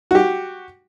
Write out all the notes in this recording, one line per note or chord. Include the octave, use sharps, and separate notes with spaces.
F#4 G4